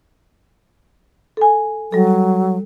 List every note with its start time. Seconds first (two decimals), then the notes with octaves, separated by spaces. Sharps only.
1.37 A4 G#5
1.92 F#3 G3 A4